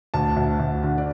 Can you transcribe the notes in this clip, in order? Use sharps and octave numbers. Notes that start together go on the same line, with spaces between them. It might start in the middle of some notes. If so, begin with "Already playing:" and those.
D2 A5
D2
D2
D3
D5